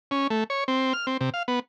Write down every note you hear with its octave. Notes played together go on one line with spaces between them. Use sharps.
C#4
A3
C#5
C4
F6
C4
C3
F5
B3